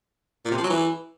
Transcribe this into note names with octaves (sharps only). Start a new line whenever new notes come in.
A#2
C3
F3
F#3
E3